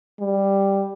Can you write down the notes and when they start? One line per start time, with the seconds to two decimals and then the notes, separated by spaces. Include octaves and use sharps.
0.20 G3